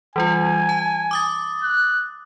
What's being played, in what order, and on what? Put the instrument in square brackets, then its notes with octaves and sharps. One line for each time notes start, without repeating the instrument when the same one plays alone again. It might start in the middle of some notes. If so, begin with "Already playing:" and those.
[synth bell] E3 G3 F4 [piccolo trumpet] G#5
[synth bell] A5
D6 D#6 A6
[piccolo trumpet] F#6